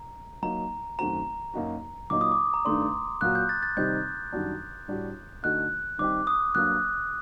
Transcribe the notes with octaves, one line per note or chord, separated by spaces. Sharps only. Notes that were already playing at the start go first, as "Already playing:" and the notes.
Already playing: A#5
F#3 A#3 D#4 A#5
F#2 D#3 A3 C4 F#4 A#5
F#2 F#3 A#3 D#4 F#4
A#2 F#3 A#3 D#4 D6
D#6
D6
A#5
G2 D#3 A3 D4 C6
A#2 F#3 A#3 F#4 F#6
G6
A6
A6
C3 D#3 G3 C4 D#4 G6
F#2 D#3 G3 D4 F#4
A2 G3 D4 F#4
D3 A3 D#4 F#4 F#6
D#3 G3 C4 D#4 G4 D6
D#6
G2 F#3 A#3 F#6